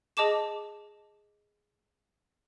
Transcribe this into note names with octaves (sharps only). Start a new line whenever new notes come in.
G#4 D#5 A5 D6 E7